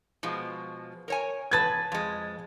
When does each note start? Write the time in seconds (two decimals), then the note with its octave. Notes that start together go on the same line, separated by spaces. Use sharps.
0.23 B2 F3 G#3
1.08 A#4 C#5 G#5
1.51 E2 B4 A5 G#6 A6
1.92 F2 G#3